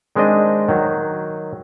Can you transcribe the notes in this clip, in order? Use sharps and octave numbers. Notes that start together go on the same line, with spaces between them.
D#3 G#3 C4 D4 D#5
D#3 F#3